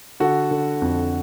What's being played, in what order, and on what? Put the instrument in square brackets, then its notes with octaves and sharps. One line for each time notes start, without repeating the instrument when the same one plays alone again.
[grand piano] D3 F#4 A4
D3
F2